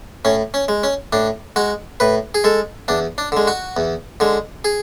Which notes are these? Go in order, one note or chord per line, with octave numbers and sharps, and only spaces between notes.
A2 C#4
C#4
G#3
C#4
A2 D4
G#3 F#4
A2 B4
G#4
G#3 A4
E2 D4
D4
D3 G#3
F#4
E2
D3 G#3
G#4